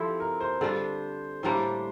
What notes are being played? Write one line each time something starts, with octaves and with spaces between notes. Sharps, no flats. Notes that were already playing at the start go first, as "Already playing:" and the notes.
Already playing: F3 C4 E4 G4 A4
A#4
C5
D3 G3 D4 F4
A2 G3 A#3 D4 C5